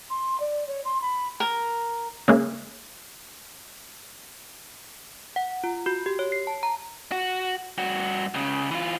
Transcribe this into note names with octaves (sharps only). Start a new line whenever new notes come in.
C6
D5
C#5
C6
B5
A#4
C#3 G#3 A#3 G#4
F#5
F4
F#4
G4
C#5
C7
A5
A#5
F#4
G2 F#4
C#2 C#3
E3 F4